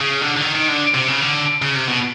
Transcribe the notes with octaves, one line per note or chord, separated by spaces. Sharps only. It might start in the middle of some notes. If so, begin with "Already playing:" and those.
C#3
D3
D3
D#3
D#3
D3
C3
C#3
D3
C#3
C3
B2